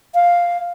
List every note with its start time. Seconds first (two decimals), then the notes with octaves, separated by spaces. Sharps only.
0.15 F5